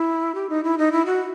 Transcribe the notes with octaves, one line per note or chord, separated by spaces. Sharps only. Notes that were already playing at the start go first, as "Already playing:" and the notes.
Already playing: E4
G4
D#4
E4
D#4
E4
F#4